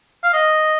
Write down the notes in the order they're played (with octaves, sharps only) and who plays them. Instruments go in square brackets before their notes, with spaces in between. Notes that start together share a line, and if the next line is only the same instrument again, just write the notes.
[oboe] F5
D#5